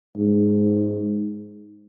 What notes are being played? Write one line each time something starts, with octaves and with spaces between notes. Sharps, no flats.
G#2